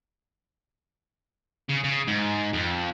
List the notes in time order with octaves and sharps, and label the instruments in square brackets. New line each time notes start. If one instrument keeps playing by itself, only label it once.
[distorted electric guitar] C#3
C#3
G#2
F2